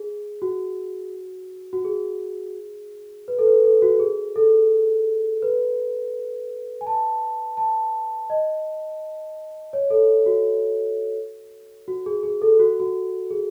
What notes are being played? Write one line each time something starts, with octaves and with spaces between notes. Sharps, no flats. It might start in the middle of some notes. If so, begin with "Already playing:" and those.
Already playing: G#4
F#4
F#4
G#4
B4
A4
B4
A4
F#4
G#4
A4
B4
G#5
A5
A5
D#5
C#5
A4
F#4
F#4
G#4
G#4
A4
F#4
F#4
G#4